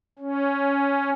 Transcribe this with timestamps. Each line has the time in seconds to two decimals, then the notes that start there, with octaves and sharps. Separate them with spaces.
0.19 C#4